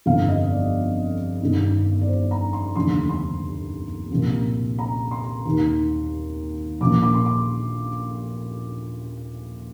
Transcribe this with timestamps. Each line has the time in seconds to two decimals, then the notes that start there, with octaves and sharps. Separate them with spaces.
0.06 G1 F2 D3 F3 F5
0.29 D#5
0.51 D5
1.41 G1 G2 D#3
2.01 D5
2.08 C5
2.31 A#5
2.53 C6
2.75 F1 D#2 D3 F3 C6
3.09 C6
4.10 C2 A#2 F3
4.79 A#5
5.11 C6
5.46 D#2 D#3
6.80 A#1 A#2 F3 D6
7.02 D6
7.14 C6
7.25 D6